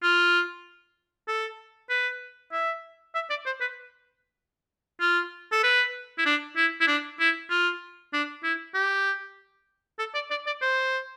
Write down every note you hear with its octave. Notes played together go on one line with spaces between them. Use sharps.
F4
A4
B4
E5
E5
D5
C5
B4
F4
A4
B4
E4
D4
E4
E4
D4
E4
F4
D4
E4
G4
A4
D5
D5
D5
C5